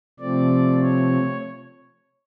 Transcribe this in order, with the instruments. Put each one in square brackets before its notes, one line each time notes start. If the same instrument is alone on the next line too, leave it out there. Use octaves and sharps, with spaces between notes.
[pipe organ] C3 F3 A3 C4 D5
C#5